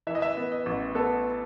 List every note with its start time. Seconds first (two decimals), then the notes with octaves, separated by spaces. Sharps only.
0.07 E3 E5
0.15 D#5
0.22 E5
0.37 B3
0.52 D#5
0.66 A1
0.95 B3 A4